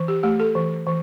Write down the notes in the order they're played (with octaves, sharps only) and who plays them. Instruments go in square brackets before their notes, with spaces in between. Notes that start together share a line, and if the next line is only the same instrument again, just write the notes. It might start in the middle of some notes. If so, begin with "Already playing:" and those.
Already playing: [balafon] E3
G4
A3 G4
A4
E3
E3